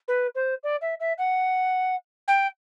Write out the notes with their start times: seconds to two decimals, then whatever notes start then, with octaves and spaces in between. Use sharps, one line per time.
0.08 B4
0.35 C5
0.63 D5
0.81 E5
1.00 E5
1.18 F#5
2.28 G5